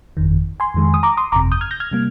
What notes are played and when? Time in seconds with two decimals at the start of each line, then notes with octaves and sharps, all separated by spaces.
0.17 G1 F2 D#3
0.60 G#5 C6
0.74 F2 D#3 G#3
0.94 D#6
1.03 A#5 D6
1.17 C6 D#6
1.32 G1 F2 C3 A#5 D6
1.52 D#6 G6
1.61 F6 G#6
1.71 G6 A#6
1.80 F6 G#6
1.91 C3 G3 A#3